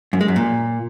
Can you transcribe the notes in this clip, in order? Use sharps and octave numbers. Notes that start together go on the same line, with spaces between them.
F#2
G#3
F#2
A#2